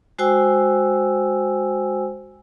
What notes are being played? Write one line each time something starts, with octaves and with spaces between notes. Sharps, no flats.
G#3 F#4 C5 G5 G#5 E6